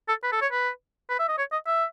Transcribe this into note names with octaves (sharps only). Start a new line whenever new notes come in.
A4
B4
A4
C#5
B4
B4
E5
D#5
C#5
D#5
E5